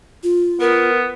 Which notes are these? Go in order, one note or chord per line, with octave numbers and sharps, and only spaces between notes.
F4
B3 A#4